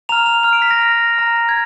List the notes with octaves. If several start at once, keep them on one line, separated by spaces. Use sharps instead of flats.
A#5 F6 F7
F7
A#5 F6 F7
D7
B6
A#6
A#5 F6
F6
A#5
A#5 F6 G#6